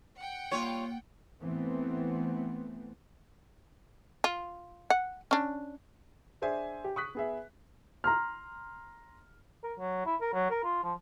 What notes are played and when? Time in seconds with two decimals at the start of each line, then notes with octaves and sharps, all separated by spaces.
0.17 F#5 G5
0.51 G3 A#3 F4 C#5
1.40 E3 A3 B3 C4
4.24 F4
4.90 F#5
5.31 C#4 D4
6.42 D4 G#4 C5 E5 G#5
6.84 G4
6.96 C#6 D#6 F#6 B6
7.15 B3 G#4 E5
8.04 A#5 C6 F6
9.64 A#4
9.79 F#3
10.06 E4
10.21 A#4
10.33 F#3
10.50 A#4
10.64 F4
10.83 F3